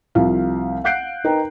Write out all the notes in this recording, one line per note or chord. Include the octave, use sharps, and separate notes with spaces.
C2 F3 F5
F5 F#5 F#6 G6 C7 D7
D#4 A#4 B4 G5